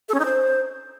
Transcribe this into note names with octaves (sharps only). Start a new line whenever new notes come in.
A4
C#4
D#4
C5